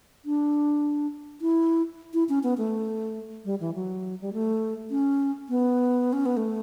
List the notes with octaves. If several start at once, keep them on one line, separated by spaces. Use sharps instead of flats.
D4
E4
E4
C#4
B3
A3
G3
E3
F#3
G3
A3
C#4
B3
C#4
B3
A3